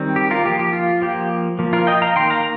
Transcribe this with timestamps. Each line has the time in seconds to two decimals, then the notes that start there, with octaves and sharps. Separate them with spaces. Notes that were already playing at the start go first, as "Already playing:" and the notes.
Already playing: D#3 G3 C4
0.16 G4
0.31 F4 A#4
0.45 F3 A#3 G4
0.59 G4
0.73 F4
1.02 F3 A#3 G4
1.59 F3 A#3
1.73 F4 A#4
1.87 D#5 G5
2.02 F5 A#5
2.16 D#3 A#3 G5 C6
2.30 F5 A#5